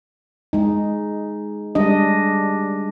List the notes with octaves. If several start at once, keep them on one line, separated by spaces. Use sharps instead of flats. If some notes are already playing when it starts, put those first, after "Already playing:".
G#3 D#4
G3 G#3 D4 D#5